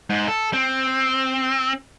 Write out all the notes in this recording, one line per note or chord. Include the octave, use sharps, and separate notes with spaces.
G#2
A4
C4